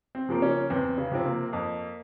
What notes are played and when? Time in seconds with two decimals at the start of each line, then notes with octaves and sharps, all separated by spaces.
0.15 C4
0.29 C#3 F3 A#3
0.42 C#4
0.70 E2 C4
0.98 C#3
1.11 C3 F3 C4
1.25 A#3
1.53 F2